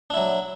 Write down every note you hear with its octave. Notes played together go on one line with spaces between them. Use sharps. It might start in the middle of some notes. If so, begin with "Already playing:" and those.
F#3 D4 E4